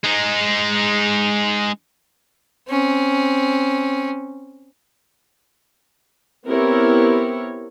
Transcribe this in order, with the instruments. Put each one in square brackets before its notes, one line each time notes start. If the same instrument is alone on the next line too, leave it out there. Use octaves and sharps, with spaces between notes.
[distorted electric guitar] G#3 D#4
[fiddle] C4 C#4
[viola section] B3 C4 E4 G4 A#4 C#5